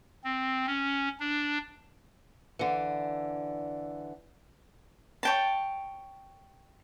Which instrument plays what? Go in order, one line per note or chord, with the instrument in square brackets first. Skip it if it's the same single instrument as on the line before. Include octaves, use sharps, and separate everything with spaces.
[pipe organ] C4
C#4
D4
[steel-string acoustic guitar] D3 E3
[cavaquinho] C#5 G5 A5